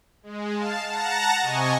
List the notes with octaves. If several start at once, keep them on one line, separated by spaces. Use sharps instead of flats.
G#3
F5 A5
F#5 A5 A#5 A#6
C3 D#5 G#5 C#6